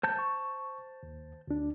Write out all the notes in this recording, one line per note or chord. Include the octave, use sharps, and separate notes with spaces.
C5 A5 G6
C#6
D#2
D2 D4